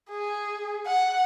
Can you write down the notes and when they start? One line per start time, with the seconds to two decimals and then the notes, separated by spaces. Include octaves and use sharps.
0.10 G#4
0.87 F#5